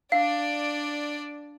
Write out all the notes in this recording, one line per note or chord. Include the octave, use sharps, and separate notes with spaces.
D4 D5 F5